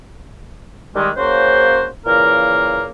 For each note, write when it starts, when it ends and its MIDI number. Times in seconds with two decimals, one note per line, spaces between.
0.95 1.10 51
0.95 1.10 55
0.95 1.10 56
1.17 1.87 49
1.17 1.87 58
1.17 1.87 61
1.17 1.87 66
1.17 1.87 72
2.07 2.88 46
2.07 2.88 49
2.07 2.88 52
2.07 2.88 58
2.07 2.88 70